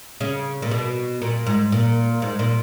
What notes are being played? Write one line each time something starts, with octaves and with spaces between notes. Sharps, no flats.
C#3
A#2
B2
A#2
G#2
A#2
G#2
A#2